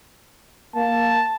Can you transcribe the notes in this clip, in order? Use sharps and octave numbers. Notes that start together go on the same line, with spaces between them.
A#3 A5